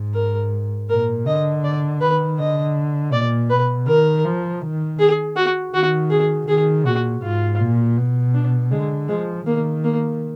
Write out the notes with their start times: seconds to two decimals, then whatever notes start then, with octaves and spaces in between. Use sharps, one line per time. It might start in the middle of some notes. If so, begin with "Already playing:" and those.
Already playing: G#2
0.14 A#4
0.90 A#2 A#4
1.26 D3 D#5
1.64 D5
2.01 D#3 B4
2.39 D3 D#5
3.13 A#2 D5
3.50 B2 B4
3.87 D#3 A#4
4.25 F3
4.62 D#3
4.99 G#4
5.36 F#4
5.73 D#3 F#4
6.10 G#4
6.48 D#3 G#4
6.86 A#2 F#4
7.22 G#2 F4
7.60 A#2
7.97 B2
8.34 D4
8.71 D3 G#3
9.09 F3 G#3
9.47 D#3 A#3
9.84 A#3